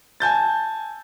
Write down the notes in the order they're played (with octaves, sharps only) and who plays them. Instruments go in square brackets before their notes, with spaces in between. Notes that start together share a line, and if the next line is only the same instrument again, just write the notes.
[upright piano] G#5 A5 G6 A6